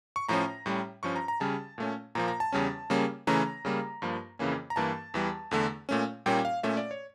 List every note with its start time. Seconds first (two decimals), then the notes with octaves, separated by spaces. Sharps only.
0.16 C#6
0.29 A2 F3 C#4 A#5
0.66 A2 G3 C#4
1.03 G2 F3 C#4 C#6
1.16 A#5
1.28 A#5
1.40 C#3 G3 C#4 A5
1.78 A#2 A3 C#4
2.15 A#2 F3 A#3 A#5
2.28 A#5
2.40 A5
2.52 E2 C#3 G3 C#4
2.90 C#3 G3 A#3 C#4
3.27 C#3 E3 A3 C#4 A#5
3.65 C#3 G3 A#3
4.02 G2 F3 A#3
4.39 F2 C#3 E3 A#3 C#4
4.70 A#5
4.76 G2 E3 A#3 A5
5.14 E2 E3 G3
5.51 E2 D3 A3
5.89 A#2 A3 C#4
6.26 A#2 G3 A#3 C#4 G5
6.45 F5
6.63 A#2 A3 C#4 E5
6.77 D5
6.91 C#5